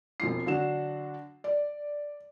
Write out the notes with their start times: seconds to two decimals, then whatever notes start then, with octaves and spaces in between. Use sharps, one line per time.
0.20 E1 F2 F4 C7
0.46 D3 F#3 D4 F#4 E7
1.44 D5